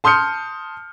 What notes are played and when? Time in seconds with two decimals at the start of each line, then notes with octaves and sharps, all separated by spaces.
0.04 A5 C6 D#6 F6 G6 C#7